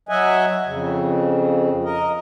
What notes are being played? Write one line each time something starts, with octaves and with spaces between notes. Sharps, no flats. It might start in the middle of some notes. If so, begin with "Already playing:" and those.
F#3 D#5 E5 F#5 G#5
F2 C#3
A#4 D#5